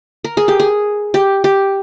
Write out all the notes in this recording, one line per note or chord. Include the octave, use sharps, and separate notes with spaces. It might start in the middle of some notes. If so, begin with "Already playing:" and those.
A#4
G#4
G4
G#4
G4
G4